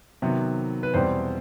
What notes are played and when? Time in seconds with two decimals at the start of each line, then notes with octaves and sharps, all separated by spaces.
0.22 C3 D#3 F#3 B3
0.83 B4
0.93 E2 B2 G3 C4 C5